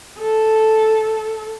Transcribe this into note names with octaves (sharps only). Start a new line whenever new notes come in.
A4